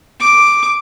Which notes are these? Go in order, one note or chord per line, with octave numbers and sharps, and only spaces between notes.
D6